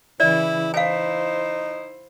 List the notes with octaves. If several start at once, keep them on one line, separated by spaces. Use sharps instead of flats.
C#3 E3 E4 D5
D#4 E4 C5 F5 G#5